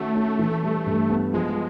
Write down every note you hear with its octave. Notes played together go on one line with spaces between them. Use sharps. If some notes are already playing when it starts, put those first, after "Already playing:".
Already playing: D#3 A3 C#4 F#4
C#4
E3
G3
G2
B3
F3 G#3